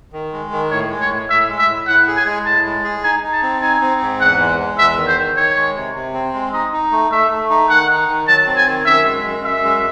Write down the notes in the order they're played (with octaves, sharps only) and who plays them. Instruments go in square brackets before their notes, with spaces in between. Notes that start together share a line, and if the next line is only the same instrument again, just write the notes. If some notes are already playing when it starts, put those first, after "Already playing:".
[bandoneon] D#3
G#3
D#3
[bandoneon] A2 [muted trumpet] C#5
[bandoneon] G#3
[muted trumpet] C#5
[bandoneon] A2
[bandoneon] A2 [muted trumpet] E5
[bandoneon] G#3
[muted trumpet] E5
[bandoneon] A2
[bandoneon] A2 [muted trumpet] F#5
[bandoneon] G#4
[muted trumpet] G#5
[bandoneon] G#3
[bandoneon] A2 [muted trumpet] A5
[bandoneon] G#3
G#4
[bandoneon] D#4 [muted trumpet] G#5
[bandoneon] D#4
[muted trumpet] A5
[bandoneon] C4
[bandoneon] D#4 [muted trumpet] G#5
[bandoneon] C4
G#2
[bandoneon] E2 [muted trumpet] F#5
[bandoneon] G#3
G#3
[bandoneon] E2 [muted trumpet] E5
[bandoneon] D#3
[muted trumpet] C5
[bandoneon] D#3
[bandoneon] D#3 [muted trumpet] C#5
[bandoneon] G#3
C3
C3
C4
G#3
[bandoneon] D#4 [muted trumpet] D#5
[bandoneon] D#4
A3
[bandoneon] A3 [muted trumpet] E5
[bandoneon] A3
D#4
[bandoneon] D#3 [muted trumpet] F#5
[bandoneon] D#4
D#3
[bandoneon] F#3 [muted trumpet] A5
[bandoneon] C4
[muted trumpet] G#5
[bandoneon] D#3
[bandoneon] F#2 [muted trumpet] E5
[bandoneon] G#3
F#2
[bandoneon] F#2 [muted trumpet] E5
[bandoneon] G#3